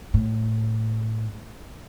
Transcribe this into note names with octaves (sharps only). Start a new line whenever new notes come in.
A2